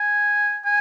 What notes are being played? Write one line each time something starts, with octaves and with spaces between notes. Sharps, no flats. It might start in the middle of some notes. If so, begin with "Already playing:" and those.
Already playing: G#5
G#5